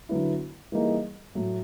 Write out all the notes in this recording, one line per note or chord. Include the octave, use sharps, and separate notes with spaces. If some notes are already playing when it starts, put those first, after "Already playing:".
D3 F#3 B3 E4
E3 G3 A#3 D#4 G#4
A2 F#3 A3